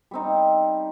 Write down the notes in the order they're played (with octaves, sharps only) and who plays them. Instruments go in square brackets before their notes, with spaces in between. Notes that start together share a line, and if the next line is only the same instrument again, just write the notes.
[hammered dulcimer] G3 C4 D#4